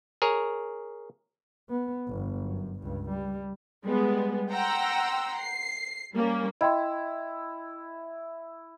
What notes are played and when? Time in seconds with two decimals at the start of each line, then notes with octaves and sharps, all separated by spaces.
0.22 G#4 A#4 C#5
1.69 B3
2.08 G1 F2
2.40 F#2
2.79 C#2 G2
3.10 G3
3.84 G3 G#3 B3
4.51 F#5 G5 A#5 C6 E6
5.38 C7
6.13 G3 A#3 C#4
6.61 E4 D#5 G5 C6